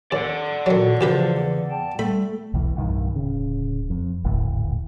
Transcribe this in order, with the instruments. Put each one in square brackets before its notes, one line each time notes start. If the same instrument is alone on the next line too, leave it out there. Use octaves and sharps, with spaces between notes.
[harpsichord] D#2 [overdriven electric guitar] D5 F#5
[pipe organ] A#2 F#4 A4 [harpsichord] D#3 F#3
[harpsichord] D2 G4 B4 [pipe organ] C#3 E3 [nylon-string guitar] F3
[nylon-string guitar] E2
[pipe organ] G5 A5
[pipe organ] G3 [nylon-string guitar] A3 [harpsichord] B5
[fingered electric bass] B1 E2 E3
B1 E2 G2 D#3
D1 C#3
F2
D#1 G#1 D2 A2